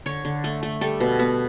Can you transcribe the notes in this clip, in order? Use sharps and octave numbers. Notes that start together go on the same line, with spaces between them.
D3 C#5
D3
A3
A3
G3 A4
B2
B3